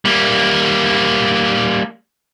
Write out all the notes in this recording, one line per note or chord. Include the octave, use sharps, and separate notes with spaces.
G3 A#3